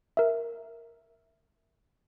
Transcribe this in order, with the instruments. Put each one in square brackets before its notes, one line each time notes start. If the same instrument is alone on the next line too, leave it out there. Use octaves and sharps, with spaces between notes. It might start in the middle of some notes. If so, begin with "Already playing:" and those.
[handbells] A#4 E5